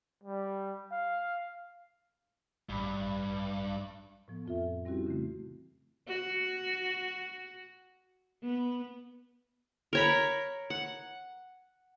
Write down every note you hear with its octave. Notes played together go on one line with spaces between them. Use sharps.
G3
F5
A1 G2 B5
A2 F3 B3
F2 C4 F4 A4 E5
G3 C4 C#4 E4 F#4 G4
C#3 E3 A3
F#4
B3
A#4 C#5 B5
F#5